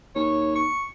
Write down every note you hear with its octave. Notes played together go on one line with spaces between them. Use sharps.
D#2 C#5
C#6